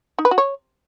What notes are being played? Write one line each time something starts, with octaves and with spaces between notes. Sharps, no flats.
D#4
B4
F#4
C#5